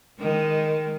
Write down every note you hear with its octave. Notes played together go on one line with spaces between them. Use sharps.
D#3 G#3